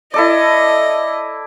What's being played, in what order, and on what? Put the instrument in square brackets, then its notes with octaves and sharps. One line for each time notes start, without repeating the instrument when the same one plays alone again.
[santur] E4 A4 D5 [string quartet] D#5